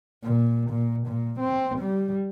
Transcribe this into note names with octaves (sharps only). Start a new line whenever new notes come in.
A#2
A#2
A#2
C4
G3